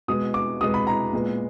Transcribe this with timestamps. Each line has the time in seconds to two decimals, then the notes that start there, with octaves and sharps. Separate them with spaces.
0.08 B2 G#3 B3 D#6
0.34 D6
0.61 B2 G#3 B3 D#6
0.74 B5
0.87 A#5
1.13 A#2 G#3 B3